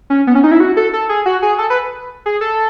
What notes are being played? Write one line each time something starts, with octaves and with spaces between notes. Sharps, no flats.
C#4
B3
C#4
D#4
E4
F#4
A4
A4
G#4
F#4
G#4
A4
B4
G#4
A4